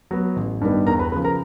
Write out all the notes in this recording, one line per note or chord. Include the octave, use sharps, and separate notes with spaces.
F#3 B3
A1
G2 D#3 G3 B3
E2 A#4 A#5
B4 B5
C#3 F3 B4 B5
A#4 A#5